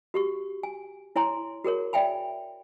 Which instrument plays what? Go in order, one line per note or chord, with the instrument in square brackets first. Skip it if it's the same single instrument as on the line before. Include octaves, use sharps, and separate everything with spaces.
[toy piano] F#4 G4 C#6
G#5
E4 C#5 G#5 A#5 C6
F#4 G#4 A#4 C#5
D5 E5 G5 G#5 B5